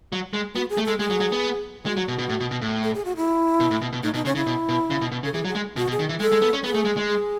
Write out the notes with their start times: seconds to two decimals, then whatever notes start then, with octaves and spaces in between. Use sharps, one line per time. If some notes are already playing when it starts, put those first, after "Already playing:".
0.12 F#3
0.33 G#3
0.55 B3 F#4
0.70 G#4
0.78 A3
0.85 G#3 A4
0.99 G#3 G#4
1.10 F#3
1.20 F#3
1.32 B3
1.86 G#3 F#4
1.97 F#3
2.08 B2
2.19 B2
2.29 A2
2.40 B2
2.51 B2
2.62 A2
2.83 A4
2.94 G#4
3.05 F#4
3.16 E4
3.60 B2
3.71 A2
3.82 B2
3.93 B2
4.03 A2 D#4
4.14 B2 D#4
4.25 C#3 C#4
4.35 C#3 E4
4.46 B2
4.69 B2
4.90 C#3
5.01 B2
5.12 B2
5.23 C#3 A4
5.33 E3 G#4
5.45 F#3
5.48 G#4
5.55 G#3
5.76 B2 F#4
5.88 B2
5.92 G#4
5.99 D#3
6.09 E3
6.20 G#3 A4
6.32 G#3
6.42 B3
6.53 C#4
6.64 B3 G#4
6.75 A3
6.85 G#3
6.97 G#3
7.07 G#4